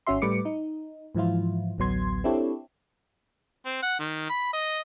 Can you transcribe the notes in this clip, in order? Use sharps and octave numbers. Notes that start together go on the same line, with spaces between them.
G#1 C#4 F#4 E5 C6
A2 G3 A3 B4 D6 C#7
D#4
G#2 E3 F3 E4 F4
A1 D2 F#3 B3 C6 G#6
C4 D4 E4 G4 A4 C#5
C4
F#5
D#3
B5
D#5